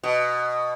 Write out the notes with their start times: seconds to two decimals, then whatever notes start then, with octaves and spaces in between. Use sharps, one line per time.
0.04 B2